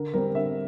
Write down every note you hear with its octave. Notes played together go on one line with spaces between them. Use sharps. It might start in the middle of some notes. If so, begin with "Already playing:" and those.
Already playing: D3 A#4
G3 C4 A#4
D3 E5